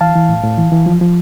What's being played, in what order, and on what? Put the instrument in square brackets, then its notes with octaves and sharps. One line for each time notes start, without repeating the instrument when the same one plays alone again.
[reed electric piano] E3 F5 A5
E3
A2
A2
E3
E3
F3
F3